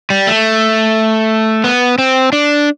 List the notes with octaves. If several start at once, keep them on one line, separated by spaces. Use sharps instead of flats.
G3
A3
B3
C4
D4